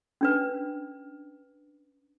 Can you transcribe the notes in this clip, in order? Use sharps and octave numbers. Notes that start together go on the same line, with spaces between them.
C#4 D4 B4